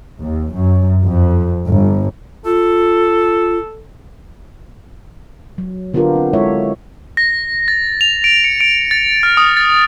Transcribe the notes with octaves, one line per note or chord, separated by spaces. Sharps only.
D#2
F#2
F2
G1
F4 A4
F#3
D3 B3 D4 F4 G4 A#4
C4
G#3 E4 A4 C#5 E5
A#6
A6
F7
D7
C#7
D7
A6
F6
D#6
A6